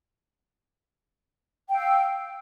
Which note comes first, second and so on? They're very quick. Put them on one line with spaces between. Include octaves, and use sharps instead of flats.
G5 F5 E6